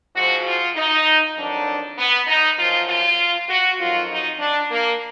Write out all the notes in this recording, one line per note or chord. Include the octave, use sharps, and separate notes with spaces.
G#2 F3 F#4
F4
D#4
F2 D#3 F#3 D4
B3
D#4
F#2 F3 F4
F4
F#4
F2 D#3 F#3 F4
D#4
D4
A#3